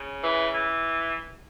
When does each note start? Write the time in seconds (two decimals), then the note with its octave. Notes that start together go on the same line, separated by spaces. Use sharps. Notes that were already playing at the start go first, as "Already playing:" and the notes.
Already playing: C#3
0.23 E3
0.52 E3